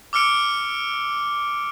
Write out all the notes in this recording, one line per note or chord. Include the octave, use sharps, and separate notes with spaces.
D6 E6 F6 C#7 D7